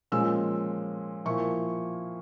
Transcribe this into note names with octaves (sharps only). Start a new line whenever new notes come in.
A#2 F3 G#3 C#4 E6
A#2 F3 A#3 E4 C#6